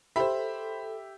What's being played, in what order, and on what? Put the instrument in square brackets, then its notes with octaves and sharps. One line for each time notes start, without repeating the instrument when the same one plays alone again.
[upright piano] G4 E5 [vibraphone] A4 [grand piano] C5 B5